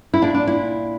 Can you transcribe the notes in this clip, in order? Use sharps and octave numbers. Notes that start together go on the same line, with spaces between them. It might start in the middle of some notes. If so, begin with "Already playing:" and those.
E4
A#2 D4
D4
E4